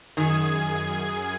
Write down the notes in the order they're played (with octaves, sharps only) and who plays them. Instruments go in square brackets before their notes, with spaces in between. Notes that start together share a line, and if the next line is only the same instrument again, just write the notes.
[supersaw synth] F#2 G#4 G#6 [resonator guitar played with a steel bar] D#3